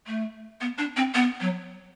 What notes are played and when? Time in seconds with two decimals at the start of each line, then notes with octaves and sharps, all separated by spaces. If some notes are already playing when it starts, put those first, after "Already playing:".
0.07 A3
0.61 B3
0.78 D4
0.96 C4
1.14 B3
1.41 F#3